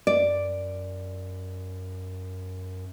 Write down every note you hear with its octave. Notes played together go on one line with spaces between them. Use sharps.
F#2 D5